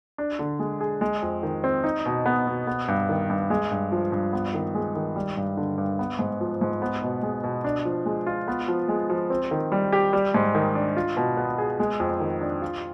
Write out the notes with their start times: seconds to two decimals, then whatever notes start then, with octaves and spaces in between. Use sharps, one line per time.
0.18 D4
0.39 D3
0.59 G#3
0.80 G#4
1.01 G#3
1.22 F2
1.43 D#3
1.64 C4
1.84 D#4
2.06 B2
2.26 B3
2.47 B2
2.67 B3
2.88 G2
3.09 D#3
3.30 G2
3.50 G#3
3.71 G2
3.92 F3
4.12 G2
4.33 B3
4.54 D#3
4.75 G#3
4.95 D#3
5.16 G3
5.37 G2
5.57 D3
5.78 G2
5.99 B3
6.19 G#2
6.40 F3
6.61 G#2
6.82 B3
7.02 B2
7.23 G#3
7.44 B2
7.64 D4
7.85 F3
8.06 G#3
8.26 F4
8.48 B3
8.68 F3
8.89 G#3
9.10 F3
9.30 C4
9.51 D#3
9.72 G3
9.93 G4
10.13 G3
10.34 G#2
10.55 D#3
10.75 D4
10.96 F4
11.17 B2
11.37 B3
11.58 G#4
11.80 G#3
12.00 F2
12.20 D#3
12.41 D4
12.62 F4